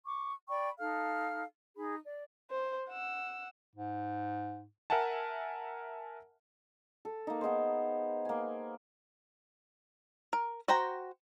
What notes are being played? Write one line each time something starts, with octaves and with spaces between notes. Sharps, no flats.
C#6 D6
D5 G5 B5 C#6
D#4 A4 F5 F6
D#4 G#4 B5
D5
C5
F#5 E6
G#2
A#4 E5 F#5 G#5 A5
A4
A#3 D#4
B3 D#4 G#4 C5
A#3 G#5
A#4
F#4 C5 G5 A#5